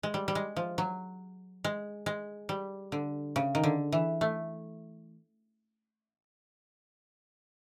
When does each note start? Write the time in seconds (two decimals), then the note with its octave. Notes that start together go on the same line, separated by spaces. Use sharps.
0.03 G#3
0.14 G3
0.28 G3
0.35 G#3
0.56 F3
0.78 F#3
1.64 G#3
2.06 G#3
2.49 G3
2.92 D3
3.36 C#3
3.55 D#3
3.64 D3
3.92 E3
4.21 A3